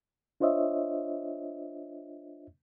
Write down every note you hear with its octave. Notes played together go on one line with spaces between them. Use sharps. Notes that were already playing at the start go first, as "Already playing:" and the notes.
D4 F4 C5 C#5 D#5 E5